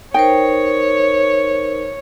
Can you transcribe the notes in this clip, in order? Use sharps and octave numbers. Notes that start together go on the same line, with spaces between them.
D#4 A#4 C5 C#5 G5